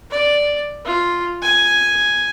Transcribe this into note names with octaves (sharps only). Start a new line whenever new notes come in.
D5
F4
G#5